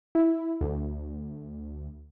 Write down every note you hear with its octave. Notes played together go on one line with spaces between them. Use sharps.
E4
D2